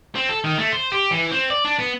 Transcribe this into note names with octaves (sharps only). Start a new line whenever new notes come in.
C4
A4
D#3
A3
C5
G4
E3
C4
D5
D4
B3